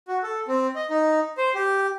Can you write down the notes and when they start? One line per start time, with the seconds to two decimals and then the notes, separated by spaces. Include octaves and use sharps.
0.08 F#4
0.23 A4
0.48 C4
0.75 D#5
0.90 D#4
1.37 C5
1.54 G4